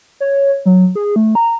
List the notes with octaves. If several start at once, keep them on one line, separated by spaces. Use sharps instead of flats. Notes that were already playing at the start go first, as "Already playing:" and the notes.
C#5
F#3
G#4
A3
A#5